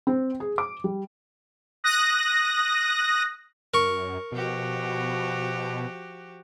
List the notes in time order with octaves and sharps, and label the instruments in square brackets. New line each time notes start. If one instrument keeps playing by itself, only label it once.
[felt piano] C4
G#4
D6
G3
[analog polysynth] D#6 F#6 A#6
[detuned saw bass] F#2 [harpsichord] A#4 C#6
[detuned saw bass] B2 [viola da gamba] F3 F#4 G4